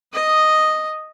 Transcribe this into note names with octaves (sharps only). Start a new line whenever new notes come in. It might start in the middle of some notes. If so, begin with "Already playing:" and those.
D#5 D#6